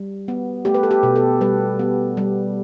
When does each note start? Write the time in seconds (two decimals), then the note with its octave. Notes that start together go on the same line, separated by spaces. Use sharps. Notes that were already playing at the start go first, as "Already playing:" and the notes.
Already playing: G3
0.28 B3
0.65 A3 G4
0.74 B4
0.83 A4
0.91 G4
1.03 B2
1.16 A4
1.41 G3 B4
1.79 B3
2.17 G3